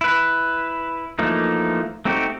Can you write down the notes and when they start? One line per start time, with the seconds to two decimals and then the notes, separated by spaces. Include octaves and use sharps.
0.01 E4 B4
1.19 E3 F3 A3 A#3 D#4
2.05 A3 C4 D#4 F#4 G4